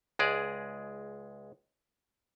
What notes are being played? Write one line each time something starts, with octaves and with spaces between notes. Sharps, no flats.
C#2 G#3 G#4 D5